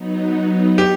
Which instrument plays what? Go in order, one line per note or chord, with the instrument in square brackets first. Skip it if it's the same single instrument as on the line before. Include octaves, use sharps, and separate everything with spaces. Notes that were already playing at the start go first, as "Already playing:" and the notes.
Already playing: [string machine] F#3 B3 D#4
[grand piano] G4